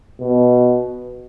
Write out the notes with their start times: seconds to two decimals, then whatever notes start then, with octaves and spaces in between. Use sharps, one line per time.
0.21 B2